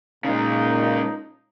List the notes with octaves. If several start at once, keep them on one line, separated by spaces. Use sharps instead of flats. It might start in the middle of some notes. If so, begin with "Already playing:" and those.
A#2 C#3 G#3 D#4